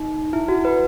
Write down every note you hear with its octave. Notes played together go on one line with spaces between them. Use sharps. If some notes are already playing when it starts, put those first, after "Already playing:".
Already playing: D#4
E4
F#4
B4